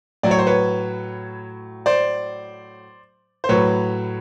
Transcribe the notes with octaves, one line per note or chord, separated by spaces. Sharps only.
A2 F#3 D5
C#5
C5
B4 C#5
C5 D5
C5
A2 F#3 B4 C#5